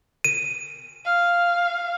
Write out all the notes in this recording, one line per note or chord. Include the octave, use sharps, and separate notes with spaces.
D#7
F5